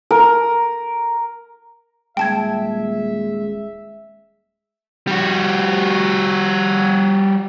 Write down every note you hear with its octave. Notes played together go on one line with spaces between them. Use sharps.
A#4
D#1 G#3 E5 G5 A5 G#6
G3 F#4